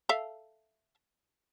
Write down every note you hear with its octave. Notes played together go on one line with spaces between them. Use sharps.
A4 E5 F5